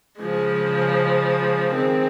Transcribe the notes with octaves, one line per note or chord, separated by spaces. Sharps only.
C#3 F3 G#3
D#3 G#3 C4